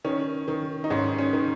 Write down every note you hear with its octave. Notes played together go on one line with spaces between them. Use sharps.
D#3 C#4
D#3
D#4
G#2 C#4
C#4
D#3